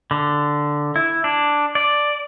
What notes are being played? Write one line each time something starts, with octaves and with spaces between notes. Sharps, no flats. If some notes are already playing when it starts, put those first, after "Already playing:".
D3
E4
D4
D5